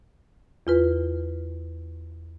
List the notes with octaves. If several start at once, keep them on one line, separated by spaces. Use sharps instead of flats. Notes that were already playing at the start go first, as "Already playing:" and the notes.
E2 F4 B4